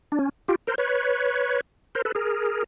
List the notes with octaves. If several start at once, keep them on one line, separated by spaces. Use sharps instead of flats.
D4
C#4
F4 G4
A#4 C5
B4 C#5
A#4 C5
A4 B4
G#4 A#4